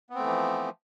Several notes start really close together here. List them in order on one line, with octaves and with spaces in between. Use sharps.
B3 C4 A3 E3 F3